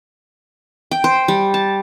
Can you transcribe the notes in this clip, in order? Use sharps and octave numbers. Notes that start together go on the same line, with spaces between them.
G5
C5
G3
A5